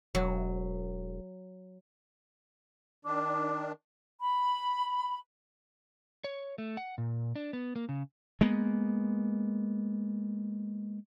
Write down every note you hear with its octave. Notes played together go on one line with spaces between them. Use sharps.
E1 F#3
D#3 D4 D6
B5
C#5
A3
F#5
A#2
D4
B3
A#3
C#3
G#3 A#3 B3